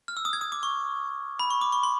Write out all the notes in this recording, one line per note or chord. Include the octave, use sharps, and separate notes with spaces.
F6
E6
D#6
G#6
D#6
D6
C#6
B5
C#6
D6
C#6
C6